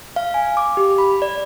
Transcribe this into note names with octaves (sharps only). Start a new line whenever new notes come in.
F5
G#5
D6
G4
B5
D5